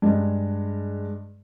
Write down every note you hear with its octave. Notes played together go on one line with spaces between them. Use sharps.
G2 G#3